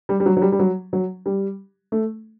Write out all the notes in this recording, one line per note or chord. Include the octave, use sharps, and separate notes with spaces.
G3
G3
F#3
F#3
G3
G3
F#3
F#3
G3
A3